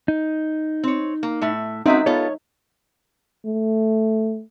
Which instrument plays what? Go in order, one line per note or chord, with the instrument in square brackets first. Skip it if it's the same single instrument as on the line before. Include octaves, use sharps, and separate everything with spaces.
[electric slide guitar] D#4
[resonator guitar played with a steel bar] C4 C#5
A#3
A2 A3 E5
[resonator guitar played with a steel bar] C4 C#4 F#4 [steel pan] D#4 E5
[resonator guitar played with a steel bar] B3 F4 A4 [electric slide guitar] C#5
[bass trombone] A3